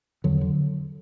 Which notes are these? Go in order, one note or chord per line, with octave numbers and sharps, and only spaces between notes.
E2 D3 F#3
D3